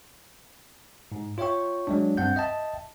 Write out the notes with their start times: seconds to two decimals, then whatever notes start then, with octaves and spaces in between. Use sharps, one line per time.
1.12 G#2
1.38 F4 C#5 E5 G5 C#6
1.87 F#3 G#3 D4
2.17 G2 C4 F#5 G6
2.36 D#5 E5 G5 A5